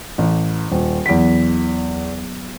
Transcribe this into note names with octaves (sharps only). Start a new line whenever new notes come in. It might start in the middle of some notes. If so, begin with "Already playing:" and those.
A1
D#1
E2 F#3 B3 B6